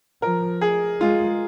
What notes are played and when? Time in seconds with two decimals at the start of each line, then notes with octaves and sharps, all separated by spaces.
0.22 F3 A#4
0.61 G#4
1.01 G#3 F4